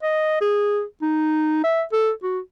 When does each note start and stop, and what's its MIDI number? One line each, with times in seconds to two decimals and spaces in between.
0.03 0.36 75
0.41 0.83 68
1.02 1.62 63
1.64 1.83 76
1.92 2.11 69
2.23 2.39 66